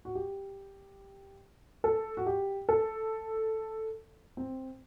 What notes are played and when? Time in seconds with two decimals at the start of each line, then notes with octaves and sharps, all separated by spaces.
0.05 F#4
0.15 G4
1.84 A4
2.17 F#4
2.27 G4
2.69 A4
4.37 C4